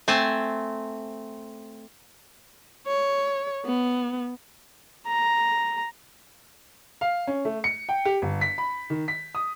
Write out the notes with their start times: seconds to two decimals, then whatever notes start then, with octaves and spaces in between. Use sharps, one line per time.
0.08 A3 C4 G#5 A5
2.87 C#5
3.66 B3
5.07 A#5
7.01 F5
7.27 C#4
7.45 A3
7.64 C#7
7.89 G5
8.05 G4
8.22 G1
8.41 B6
8.58 B5
8.90 D#3
9.08 B6
9.35 D#6